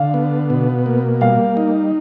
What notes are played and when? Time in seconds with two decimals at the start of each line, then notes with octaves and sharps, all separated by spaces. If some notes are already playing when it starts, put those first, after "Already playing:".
Already playing: D3 F5
0.14 B3
0.50 B2
0.86 A#3
1.21 G3 F5
1.57 D#4